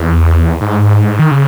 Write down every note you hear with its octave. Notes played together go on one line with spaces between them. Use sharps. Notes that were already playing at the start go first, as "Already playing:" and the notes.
Already playing: E2
G#2
D#3
C#3